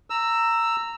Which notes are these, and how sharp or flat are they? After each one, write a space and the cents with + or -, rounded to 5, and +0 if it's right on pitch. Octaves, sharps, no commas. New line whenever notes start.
A#5 -15 E6 +5